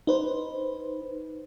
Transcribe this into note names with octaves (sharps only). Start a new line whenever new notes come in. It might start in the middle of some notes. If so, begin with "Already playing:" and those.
D#4 B4 C5